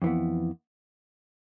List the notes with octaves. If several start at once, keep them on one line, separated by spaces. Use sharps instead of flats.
F2 E3 B3